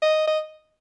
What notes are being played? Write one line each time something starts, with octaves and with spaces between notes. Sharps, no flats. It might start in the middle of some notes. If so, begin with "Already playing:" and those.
D#5
D#5